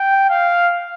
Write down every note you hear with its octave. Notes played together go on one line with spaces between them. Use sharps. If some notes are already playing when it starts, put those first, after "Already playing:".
Already playing: G5
F5